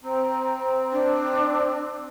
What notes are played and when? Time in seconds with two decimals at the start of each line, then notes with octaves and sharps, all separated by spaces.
0.04 C4 A#5
0.92 D4